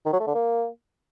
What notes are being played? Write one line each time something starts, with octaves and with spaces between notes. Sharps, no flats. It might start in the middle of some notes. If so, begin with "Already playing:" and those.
D#3
F#3
A3
D3
A#3